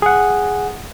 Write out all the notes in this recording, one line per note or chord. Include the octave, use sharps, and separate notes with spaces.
G#4 F#5